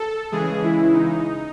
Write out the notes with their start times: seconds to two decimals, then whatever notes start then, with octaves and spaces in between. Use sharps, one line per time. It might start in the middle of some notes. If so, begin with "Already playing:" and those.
Already playing: A4
0.32 C#3 E3 G#3 G#4
0.63 E4
0.94 D#4